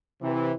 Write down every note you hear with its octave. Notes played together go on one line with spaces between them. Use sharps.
C3 E3